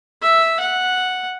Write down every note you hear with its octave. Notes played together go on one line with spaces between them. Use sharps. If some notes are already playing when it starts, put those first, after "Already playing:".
E5
F#5